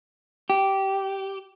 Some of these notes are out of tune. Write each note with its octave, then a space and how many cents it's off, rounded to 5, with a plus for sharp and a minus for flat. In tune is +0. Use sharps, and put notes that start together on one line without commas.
G4 -15